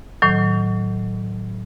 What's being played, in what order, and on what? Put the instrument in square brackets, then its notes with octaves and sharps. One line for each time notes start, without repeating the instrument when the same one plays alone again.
[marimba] A2 D#3 F#3